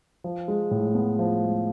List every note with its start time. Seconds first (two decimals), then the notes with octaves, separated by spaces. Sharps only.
0.24 F3
0.48 G#3
0.71 A2
0.95 B3
1.19 F3
1.43 G#3